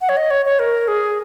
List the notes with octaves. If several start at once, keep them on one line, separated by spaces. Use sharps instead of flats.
F#5
C#5
D#5
C#5
C#5
A#4
G#4